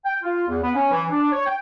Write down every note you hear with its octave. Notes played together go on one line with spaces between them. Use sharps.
G5
F4
E2
B3
C#4
E3
D4
C#5
G5